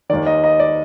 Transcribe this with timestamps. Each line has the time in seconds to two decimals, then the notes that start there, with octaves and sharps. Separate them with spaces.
0.10 D#2 D#3 D5
0.26 D#5
0.44 D#5
0.60 D5